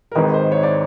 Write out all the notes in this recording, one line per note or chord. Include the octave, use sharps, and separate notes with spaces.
A#4
G#1 G#2 D#3 B4
B4
C5
C#5
D5